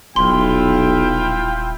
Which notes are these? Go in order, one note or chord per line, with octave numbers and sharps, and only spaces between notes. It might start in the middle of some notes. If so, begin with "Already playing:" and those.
D#1 B1 E4 F4 G5 C6